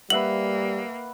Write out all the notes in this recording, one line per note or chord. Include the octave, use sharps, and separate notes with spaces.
G3 A#3 B4 E5 F#5 F#7